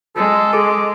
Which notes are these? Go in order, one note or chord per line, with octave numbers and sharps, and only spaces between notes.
G#3 A4
G#4 A4 D6